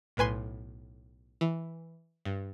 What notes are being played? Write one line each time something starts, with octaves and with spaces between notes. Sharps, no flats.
B1 A2 B4 G#5 C6
E3
G2